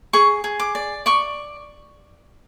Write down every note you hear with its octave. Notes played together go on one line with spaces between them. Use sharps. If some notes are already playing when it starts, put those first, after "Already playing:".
G#4 C#6
G#4
D6
D5
D5 C#6